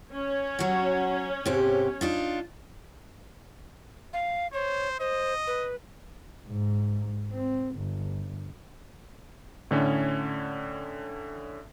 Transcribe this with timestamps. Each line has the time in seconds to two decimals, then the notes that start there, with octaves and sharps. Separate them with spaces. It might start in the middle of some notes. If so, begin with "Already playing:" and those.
0.11 C#4 C#5
0.59 F#3 F#4
1.46 G#2 C3 G4
2.01 D4 D#4 F4
4.13 F5
4.53 C5 C#5
5.00 C5 D#5
5.47 B4
6.47 G#2
7.31 C4
7.76 G1
9.71 A2 D3 C#4 C#5